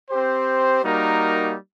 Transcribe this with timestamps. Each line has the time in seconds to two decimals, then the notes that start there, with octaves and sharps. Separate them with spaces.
0.10 C4 G4 C5
0.82 G3 A#3 D#4 F#4 A#4